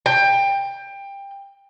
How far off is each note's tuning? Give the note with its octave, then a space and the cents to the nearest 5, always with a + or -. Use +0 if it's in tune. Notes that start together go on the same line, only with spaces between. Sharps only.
G5 +20